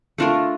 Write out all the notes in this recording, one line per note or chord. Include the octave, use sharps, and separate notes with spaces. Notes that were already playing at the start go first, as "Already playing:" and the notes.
A3 D4 F4 A#4